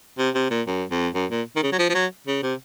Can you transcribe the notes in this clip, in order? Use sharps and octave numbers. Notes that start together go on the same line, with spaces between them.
C3
C3
A#2
F#2
F2
F#2
A#2
D#3
C#3
F#3
F3
F3
F#3
C#3
C3